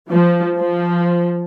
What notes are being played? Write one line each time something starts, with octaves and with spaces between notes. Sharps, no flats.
F3
F3